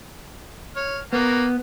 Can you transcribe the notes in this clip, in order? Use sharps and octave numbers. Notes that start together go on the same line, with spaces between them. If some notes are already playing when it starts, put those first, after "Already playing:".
C#5 F6
A#3 B3 F#4 A#4